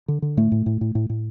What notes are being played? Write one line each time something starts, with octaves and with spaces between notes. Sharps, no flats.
D3
D3
A2 A3
A2
A2
A2
A2
A2